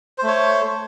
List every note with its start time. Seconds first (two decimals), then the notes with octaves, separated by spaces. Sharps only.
0.18 C5
0.23 A3
0.28 C#5